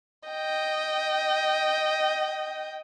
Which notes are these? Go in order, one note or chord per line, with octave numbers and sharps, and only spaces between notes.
D#5 G5